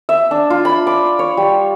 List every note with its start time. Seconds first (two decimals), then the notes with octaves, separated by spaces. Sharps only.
0.09 E5
0.31 D4
0.50 F4
0.65 B5
0.87 D6
1.19 C#5
1.37 G3